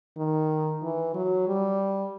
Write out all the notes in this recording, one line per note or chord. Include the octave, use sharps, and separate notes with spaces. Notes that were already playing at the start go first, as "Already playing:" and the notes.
D#3
E3
F#3
G3